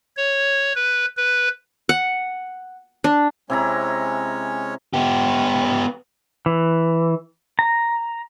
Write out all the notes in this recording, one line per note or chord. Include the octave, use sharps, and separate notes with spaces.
C#5
B4
B4
F#5
D4
C3 G#3 C#4 E4 C#5 A#5
B3 G4
E3
A#5